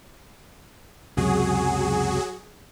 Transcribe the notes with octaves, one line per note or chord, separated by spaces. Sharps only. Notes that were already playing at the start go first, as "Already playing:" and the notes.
C#2 F#2 C3 F#3 F#4 G#4